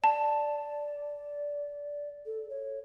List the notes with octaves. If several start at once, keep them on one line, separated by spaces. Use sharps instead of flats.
D5 A5
A4
C#5